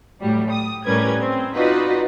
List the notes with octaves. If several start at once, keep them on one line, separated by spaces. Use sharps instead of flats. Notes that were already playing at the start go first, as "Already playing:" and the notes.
A2 F#3 G3
D#6
A2 G3 C#4 A#4 B4 G#6
C4
D#4 F4 F#4 B4 D5 D#5